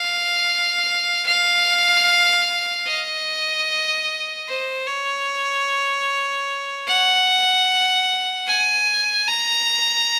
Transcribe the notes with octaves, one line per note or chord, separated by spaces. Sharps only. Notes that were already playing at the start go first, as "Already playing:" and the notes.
Already playing: F5
F5
D#5
C5
C#5
F#5
G#5
A#5